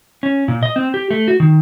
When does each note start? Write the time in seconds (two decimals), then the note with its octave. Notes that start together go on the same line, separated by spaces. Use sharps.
0.23 C#4
0.48 A#2
0.63 D#5
0.76 C4
0.94 G4
1.11 A3
1.28 F#4
1.40 D#3